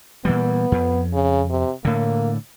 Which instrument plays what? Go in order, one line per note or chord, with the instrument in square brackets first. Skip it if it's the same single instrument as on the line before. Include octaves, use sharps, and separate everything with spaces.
[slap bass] A#2 E3 G3 [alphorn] B3
[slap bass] F2
[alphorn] C#3
C3
[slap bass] A2 D3 [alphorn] A#3